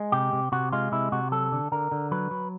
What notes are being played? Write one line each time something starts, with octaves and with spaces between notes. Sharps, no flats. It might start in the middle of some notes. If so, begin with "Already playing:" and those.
Already playing: G#3
C3 G4
C3
C3 F#4
G#3 F4
C3 E4
C3 F#4
F#3 A4
D3
D3 A#4
D3
F#3 B4
F#3